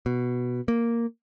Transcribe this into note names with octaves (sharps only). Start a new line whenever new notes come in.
B2
A#3